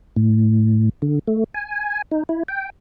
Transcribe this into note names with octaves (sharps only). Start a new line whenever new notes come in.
A2
D3
A3
G#5
D#4
E4
G5